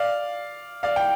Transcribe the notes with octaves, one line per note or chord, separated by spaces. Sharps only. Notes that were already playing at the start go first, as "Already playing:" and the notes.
Already playing: D5 F5
D5 F5
G5